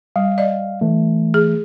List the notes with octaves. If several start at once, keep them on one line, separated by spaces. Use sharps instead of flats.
G3 F5
D5 D#5
E3 A3
G#4